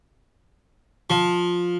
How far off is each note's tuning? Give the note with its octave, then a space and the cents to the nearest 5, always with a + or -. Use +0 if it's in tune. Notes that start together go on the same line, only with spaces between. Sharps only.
F3 +10